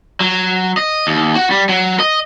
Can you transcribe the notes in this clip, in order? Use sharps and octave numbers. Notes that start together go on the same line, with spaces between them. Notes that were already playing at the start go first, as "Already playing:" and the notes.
F#3
D#5
D#2
F#4
G3
F#3
D#5